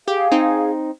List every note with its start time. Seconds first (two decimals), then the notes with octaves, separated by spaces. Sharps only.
0.08 G4 G#4 F5
0.31 C4 D#4